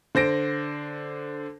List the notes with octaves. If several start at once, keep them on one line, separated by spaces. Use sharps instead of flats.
D3 C5 A#6 D7